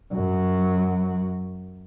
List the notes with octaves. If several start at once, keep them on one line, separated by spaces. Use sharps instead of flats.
F#2 F#3